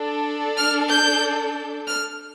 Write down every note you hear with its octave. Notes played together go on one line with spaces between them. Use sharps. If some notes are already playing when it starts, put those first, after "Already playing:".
Already playing: D4 A4
F6
G6
F6